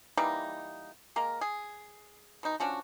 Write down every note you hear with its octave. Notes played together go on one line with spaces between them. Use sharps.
E3 G3 A#3 D#4
G#3 A#3 A#4
G#4
B2 D#4
F3 C#4 D4 F#4